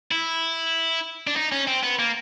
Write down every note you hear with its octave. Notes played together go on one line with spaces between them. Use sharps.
E4
D4
D#4
C#4
C4
B3
A#3